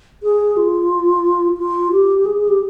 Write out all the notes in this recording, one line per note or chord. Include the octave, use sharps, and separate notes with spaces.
G#4
F4
F4
G4
G#4
G#4
G4